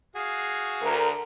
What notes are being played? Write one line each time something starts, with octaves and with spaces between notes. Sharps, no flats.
F#4 G#4 F5
D2 A#4